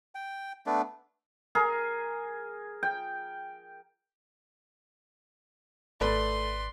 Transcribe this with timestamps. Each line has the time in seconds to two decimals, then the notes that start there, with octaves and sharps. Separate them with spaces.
0.15 G5
0.66 A3 B3 D4
1.55 G#4 A#4
2.83 G5
6.01 G#1 A3 B4 D5 B5 C6